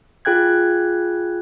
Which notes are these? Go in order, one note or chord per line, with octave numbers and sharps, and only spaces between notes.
F4 G#4 G5 F#6 G#6